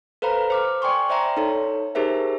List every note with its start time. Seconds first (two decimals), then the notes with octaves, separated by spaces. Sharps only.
0.22 A4 B4 C5 F5 A#5 B5
0.50 C5 D6 F6
0.82 D5 G5 G#5 C6 C#6
1.09 C5 D5 E5 G5 A#5 C6
1.37 D#4 A4 C#5
1.95 D#4 G4 G#4 A#4 C5 E5